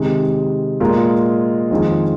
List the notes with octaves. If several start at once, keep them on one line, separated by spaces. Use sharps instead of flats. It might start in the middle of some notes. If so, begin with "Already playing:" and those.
Already playing: C3 D#3 G#3
A#2 G#3 F4 A#4 D#5
F2 D#3 G#3 F4 G#4